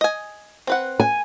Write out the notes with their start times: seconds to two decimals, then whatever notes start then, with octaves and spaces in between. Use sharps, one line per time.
0.01 D#5 G#5
0.67 C4 B4 F#5
1.00 G#5